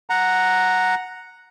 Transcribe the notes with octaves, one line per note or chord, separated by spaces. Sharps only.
F#5 A#5